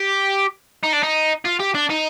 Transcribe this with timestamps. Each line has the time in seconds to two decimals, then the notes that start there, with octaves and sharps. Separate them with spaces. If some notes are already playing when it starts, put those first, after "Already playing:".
Already playing: G4
0.84 D#4
0.93 D4
1.03 D#4
1.45 F4
1.59 G4
1.75 D4
1.90 D#4